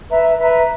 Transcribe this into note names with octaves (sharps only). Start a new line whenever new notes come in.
B4 E5 A#5
B4 E5 A#5